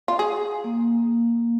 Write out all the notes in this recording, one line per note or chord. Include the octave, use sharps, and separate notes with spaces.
F4
G#4
A#3